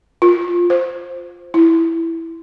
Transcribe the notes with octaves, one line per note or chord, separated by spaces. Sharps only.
F4
C5
E4